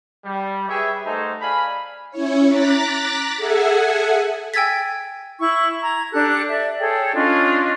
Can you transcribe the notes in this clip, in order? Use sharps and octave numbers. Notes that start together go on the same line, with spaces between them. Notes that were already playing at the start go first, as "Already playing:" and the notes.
G3
G4 G#4 B4 C#5 E5
A3 D#4 F#4 G#4 C5 A5
D5 F5 G#5 B5
C#4 E4 C#5
A#5 D6 F#6 A6 B6
G#4 A4 E5 F#5 G#5
G5 G#5 E6 G#6 A6 B6
E4 C#6
A#5 G#6
D4 G4 A4 F#6
D5 E5
G#4 A4 C#5 G5
C#4 D4 F4 D#5